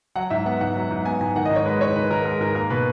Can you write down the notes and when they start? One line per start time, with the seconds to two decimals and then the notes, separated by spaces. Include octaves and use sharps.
0.16 F#3 F#5
0.30 G#2 E5
0.46 B3 F#5
0.61 G#2 F#5
0.76 F#3
0.90 G#2
1.05 B3 G#5
1.21 G#2 G#5
1.35 D#3 F#5
1.45 D#5
1.51 G#2
1.56 C#5
1.65 G#3 B4
1.80 G#2 C#5
1.95 D#3 B4
2.11 G#2 A#4
2.25 G#3 A#4
2.41 G#2 A#4
2.55 A#3 A#4
2.70 B2 B4